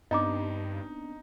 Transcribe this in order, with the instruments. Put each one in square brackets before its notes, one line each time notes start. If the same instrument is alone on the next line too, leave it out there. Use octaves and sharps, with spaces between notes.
[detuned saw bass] G2 [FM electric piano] B3 C4 D4 [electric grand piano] D#4 [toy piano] D#5 A#5 D6